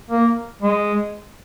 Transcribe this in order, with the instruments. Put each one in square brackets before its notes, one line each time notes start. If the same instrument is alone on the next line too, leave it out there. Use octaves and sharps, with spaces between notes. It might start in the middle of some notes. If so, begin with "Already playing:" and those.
[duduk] A#3
G#3